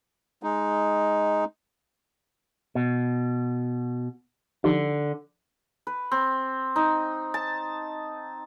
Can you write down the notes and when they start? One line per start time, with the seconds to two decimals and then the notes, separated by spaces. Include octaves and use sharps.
0.43 G#3 D#4
2.75 B2
4.64 D3 F3 D#4 G4
5.87 B4
6.11 C4
6.76 D#4
7.34 A5